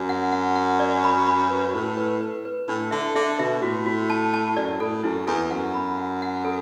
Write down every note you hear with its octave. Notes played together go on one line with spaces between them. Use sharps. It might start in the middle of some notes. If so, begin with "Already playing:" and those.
Already playing: F#2
F#5
F#5
F#5
D5
B5
B5
B4
A2 B4
B4
B4
B4
A2 D4
D3 E5
D3 E5
B2 E5
A2 F#4
F#4
A5
A5
F#2 D5
A2 A4
F#2 E4
E2 A4
F#2 F#5
B5
F#5
F#5
A4